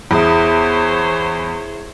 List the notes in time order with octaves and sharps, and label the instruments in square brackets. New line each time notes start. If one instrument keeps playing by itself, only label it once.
[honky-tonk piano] E2 [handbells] E4 G#4 E5 [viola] C5 C#5